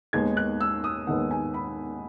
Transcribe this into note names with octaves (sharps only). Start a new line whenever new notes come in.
D#2 D#3 G#3 B3 G#6
F#6
E6
D#6
D#2 D#3 G#3 B3 F#5
G#5
B5